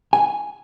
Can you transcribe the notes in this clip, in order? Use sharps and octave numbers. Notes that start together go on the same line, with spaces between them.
G#5